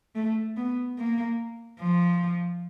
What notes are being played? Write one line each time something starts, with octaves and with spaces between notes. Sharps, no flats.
A3
B3
A#3
F3